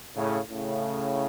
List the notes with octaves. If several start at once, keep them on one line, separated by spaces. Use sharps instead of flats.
A2 C#3
A2 C#3